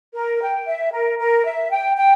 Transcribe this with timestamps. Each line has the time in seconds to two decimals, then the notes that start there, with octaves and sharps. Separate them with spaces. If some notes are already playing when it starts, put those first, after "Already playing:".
0.15 A#4
0.41 G5
0.66 E5
0.93 A#4
1.19 A#4
1.45 E5
1.72 G5
1.97 G5